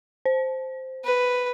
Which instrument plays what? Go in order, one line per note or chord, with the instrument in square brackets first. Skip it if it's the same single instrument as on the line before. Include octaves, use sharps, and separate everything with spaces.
[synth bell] C5
[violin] B4